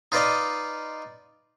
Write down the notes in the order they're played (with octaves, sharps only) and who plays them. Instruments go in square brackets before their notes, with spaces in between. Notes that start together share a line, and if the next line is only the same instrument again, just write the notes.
[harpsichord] D#4 F4 B4 D5 D#5